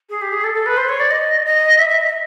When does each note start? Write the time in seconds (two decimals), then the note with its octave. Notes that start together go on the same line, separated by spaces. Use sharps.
0.09 G#4
0.21 G4
0.32 G#4
0.44 A4
0.54 A4
0.66 B4
0.77 C5
0.88 C#5
0.99 D5
1.10 D#5
1.45 D#5
1.78 E5
1.89 E5
2.01 D#5